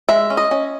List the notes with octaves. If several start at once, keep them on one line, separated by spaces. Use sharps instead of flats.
G#3 E5
C#4
D#5
C#4